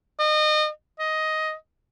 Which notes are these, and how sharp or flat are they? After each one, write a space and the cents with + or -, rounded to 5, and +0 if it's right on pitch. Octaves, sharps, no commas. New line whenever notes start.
D#5 -30
D#5 +10